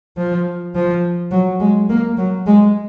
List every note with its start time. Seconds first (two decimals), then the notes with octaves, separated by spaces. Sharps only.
0.17 F3
0.75 F3
1.31 F#3
1.60 G#3
1.89 A#3
2.17 F#3
2.47 G#3